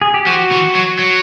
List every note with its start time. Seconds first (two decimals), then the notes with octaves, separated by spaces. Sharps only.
0.02 G#4
0.14 G4
0.26 F3 F#4
0.51 E3
0.75 F#3
0.99 F#3